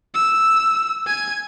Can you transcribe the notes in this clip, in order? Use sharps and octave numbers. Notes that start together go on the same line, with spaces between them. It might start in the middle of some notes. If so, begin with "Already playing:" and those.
E6
G#5 G#6